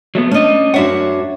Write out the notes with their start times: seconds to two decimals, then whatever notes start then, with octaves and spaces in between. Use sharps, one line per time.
0.15 F#3 A3 B3
0.31 A3 C#4 D4 D#5
0.74 F#2 D4 F#4 C#5 E5 F#5